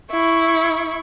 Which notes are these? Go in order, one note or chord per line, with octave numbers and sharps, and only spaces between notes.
E4 C#6